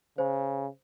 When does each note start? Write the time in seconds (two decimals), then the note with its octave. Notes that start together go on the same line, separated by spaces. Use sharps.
0.18 C#3 C5